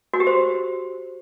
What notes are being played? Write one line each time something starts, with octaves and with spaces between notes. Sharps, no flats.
F#4
G4
C5